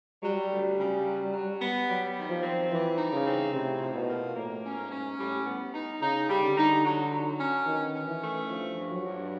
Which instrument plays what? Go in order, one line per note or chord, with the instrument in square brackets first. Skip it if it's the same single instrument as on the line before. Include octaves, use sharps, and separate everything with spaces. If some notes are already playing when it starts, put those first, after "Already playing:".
[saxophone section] F#3 [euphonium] G3
[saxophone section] D2
C#3
F#3
F#3
B3
[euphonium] F#3 [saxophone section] G3
[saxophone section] D#3
[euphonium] F3
[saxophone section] C4
[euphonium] E3 [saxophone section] G3
[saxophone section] D#4
[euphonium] C#3
[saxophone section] C4
[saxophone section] A2 [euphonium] C3
[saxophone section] F3
[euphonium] B2
[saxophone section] A#3
[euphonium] A2 [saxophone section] A#3
[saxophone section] C#4
[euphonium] G#2
[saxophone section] C#4
[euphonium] A2 [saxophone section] G3
[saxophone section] B3
D#4
[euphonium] C#3 [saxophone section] D#4
[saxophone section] G3
[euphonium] D3
[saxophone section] D#4
F#3
F#3
C#4
[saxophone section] B2 [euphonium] D#3
[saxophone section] C#4
[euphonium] E3
[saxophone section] A3
[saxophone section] G2 [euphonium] F3
[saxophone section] G2
[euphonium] F#3
[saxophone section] G2